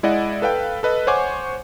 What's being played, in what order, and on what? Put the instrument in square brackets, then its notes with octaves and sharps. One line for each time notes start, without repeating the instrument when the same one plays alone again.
[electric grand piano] G#3 E4 D5 D#5 F#5
A4 B4 F5 G5
A4 B4 D#5
C5 C#5 F#5 G#5 C#6 D6